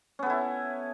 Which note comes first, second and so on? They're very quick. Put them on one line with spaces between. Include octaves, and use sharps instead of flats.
C#4 B3 A4 E4